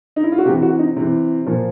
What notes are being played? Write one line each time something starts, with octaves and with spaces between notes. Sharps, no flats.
D#4
E4
F4
F#4
C3 E3 G4
F#4
D#4
C3 E3
A#2 F3